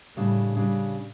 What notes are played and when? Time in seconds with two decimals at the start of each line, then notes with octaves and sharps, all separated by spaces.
0.16 A2 C#3 G3 D4
0.56 C#3 G3 D4